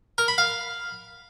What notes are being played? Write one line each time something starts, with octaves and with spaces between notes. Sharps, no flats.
A#4
B5
F5